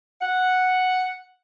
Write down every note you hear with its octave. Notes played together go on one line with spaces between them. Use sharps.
F#5